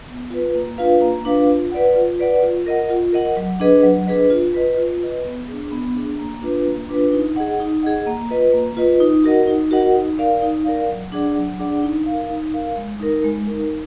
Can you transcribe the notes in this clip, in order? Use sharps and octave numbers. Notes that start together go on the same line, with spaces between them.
B3
F4 B4
A#3
D4 F4 B4 F5
A#3
D4 F4 B4 F5
F4
B4 D5 F#5
F4
B4 D5 F#5
F4
A#4 D#5 F#5
F4
A#4 D#5 F#5
F#3
D4 G#4 B4 D#5
F#3
D4 G#4 B4 D#5
F4
B4 D#5
F4
B4 D#5
B3
D4 G#4
B3
D4 G#4
A#3
D4 F4 B4
A#3
D4 F4 B4
D#4
G#4 D#5 F#5
D#4
G#4 D#5 F#5
A#3
F4 B4 D#5
A#3
F4 B4 D#5
D#4
F#4 A#4 D#5 F#5
D#4
F#4 A#4 D#5 F#5
D#4
A#4 D5 F5
D#4
A#4 D5 F5
F#3
D4 G#4 D5 F#5
F#3
D4 G#4 D5 F#5
D#4
F5
A#4
D#4
A#4 F5
G#3
D#4 A#4
G#3
D#4 A#4